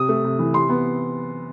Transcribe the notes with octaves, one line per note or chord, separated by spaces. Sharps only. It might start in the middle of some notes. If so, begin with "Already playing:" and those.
Already playing: C3 D#6
A3
C3
E3
C3 C6
B3